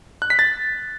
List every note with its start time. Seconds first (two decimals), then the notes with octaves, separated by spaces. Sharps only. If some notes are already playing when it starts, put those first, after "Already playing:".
0.22 F#6
0.30 B6
0.39 A6